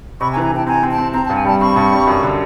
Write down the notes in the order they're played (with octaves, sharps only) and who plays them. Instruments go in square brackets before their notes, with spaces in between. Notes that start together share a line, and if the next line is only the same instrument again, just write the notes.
[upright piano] C3 [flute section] B5 C#6
[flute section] G#5 A#5
[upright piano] E3
[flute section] G#5 A#5
[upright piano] E3 [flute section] G5 A5
[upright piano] C4 [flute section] G#5 A#5
[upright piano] C4
[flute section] G5 A5
[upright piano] C4
[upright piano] C4 [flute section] A#5
[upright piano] G2 [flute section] A5
[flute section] G#5
[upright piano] G3 [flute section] G5 A5
[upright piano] C4 [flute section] B5 C#6
[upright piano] G2
G3
F#2
D3